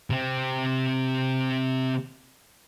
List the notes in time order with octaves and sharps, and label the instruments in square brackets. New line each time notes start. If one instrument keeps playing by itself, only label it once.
[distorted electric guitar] C3 C4